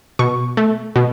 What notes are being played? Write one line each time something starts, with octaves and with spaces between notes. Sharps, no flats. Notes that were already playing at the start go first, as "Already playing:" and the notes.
B2 C#6
A3
B2